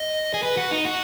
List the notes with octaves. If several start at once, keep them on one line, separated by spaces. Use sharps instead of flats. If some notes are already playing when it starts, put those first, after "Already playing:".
Already playing: D#5
G#4
B4
F#4
D#4
F#4